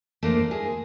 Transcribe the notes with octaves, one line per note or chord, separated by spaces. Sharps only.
A3 A#3 D4 C5
G#4